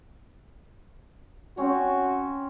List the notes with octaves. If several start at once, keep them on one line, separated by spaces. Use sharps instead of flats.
C4 C#4 F#4 C#5